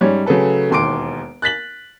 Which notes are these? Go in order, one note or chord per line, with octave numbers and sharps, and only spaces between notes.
G#2 G3 C#4 C#5
C#3 F#3 A3 A4 B4
E1 D#2 C6 D6 D7
F#6 A6 B6 F#7